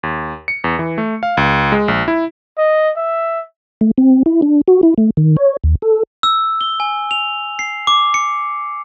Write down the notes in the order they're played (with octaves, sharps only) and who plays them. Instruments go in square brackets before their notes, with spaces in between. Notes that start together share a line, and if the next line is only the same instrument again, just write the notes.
[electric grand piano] D#2
C#7
E2
E3
A3
F5
C#2
G#3
A#1
E4
[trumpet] D#5
E5
[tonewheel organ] A3
C4
E4
D4
F#4
E4
A3
D#3
C#5
D#2
A4
[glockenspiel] E6
G7
G#5
F7
C7
D6
C#7